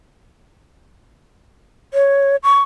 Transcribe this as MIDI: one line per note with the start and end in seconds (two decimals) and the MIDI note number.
1.94 2.36 73
2.44 2.62 85